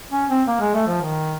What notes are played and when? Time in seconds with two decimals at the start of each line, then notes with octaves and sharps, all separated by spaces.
0.11 C#4
0.29 C4
0.47 A#3
0.60 G#3
0.74 A3
0.87 F3
1.01 D#3